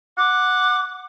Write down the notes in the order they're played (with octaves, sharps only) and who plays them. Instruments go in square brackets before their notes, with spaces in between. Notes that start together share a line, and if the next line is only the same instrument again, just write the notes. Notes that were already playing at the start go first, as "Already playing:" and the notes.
[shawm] F#5 [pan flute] D6